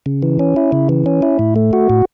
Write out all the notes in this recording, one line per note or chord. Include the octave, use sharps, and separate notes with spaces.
C#3
E3
C#4
E4
C#3
E3
C#4
E4
A2
A3
F#4
A2